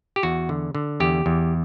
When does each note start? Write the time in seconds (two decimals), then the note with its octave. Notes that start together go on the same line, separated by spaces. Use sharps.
0.16 G4
0.23 E2 F#4
0.49 D3
0.75 D3
1.00 E2 G4
1.26 E2